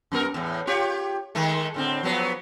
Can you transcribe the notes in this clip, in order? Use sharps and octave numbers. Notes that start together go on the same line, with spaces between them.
F#2 B3 A#4
E2 A2
F4 G4 C#5
D#3 G#3 A3
A2 D3 C4
F3 F#3 B3